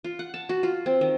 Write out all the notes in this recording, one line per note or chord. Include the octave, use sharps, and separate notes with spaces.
F4
F#5
A5
F#4
F4
C4
D#3